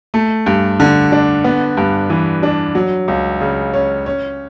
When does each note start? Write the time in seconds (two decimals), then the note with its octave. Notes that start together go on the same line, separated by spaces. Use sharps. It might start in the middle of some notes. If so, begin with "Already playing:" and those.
0.14 A3
0.46 G2
0.80 D3
1.12 D4
1.44 B3
1.77 G2
2.10 E3
2.43 D4
2.75 F#3
3.08 C#2
3.41 C#3
3.74 C#4
4.06 C#4